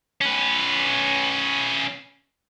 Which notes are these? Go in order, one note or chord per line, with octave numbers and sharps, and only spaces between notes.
C#4 B4